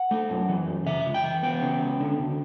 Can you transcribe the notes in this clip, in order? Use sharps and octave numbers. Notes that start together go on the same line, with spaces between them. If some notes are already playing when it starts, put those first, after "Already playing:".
Already playing: F#5
A3
F#2
E3
F#2
C#3 E5
C#2
G5
E3
B3 G5
C#3
C#2
D3
D2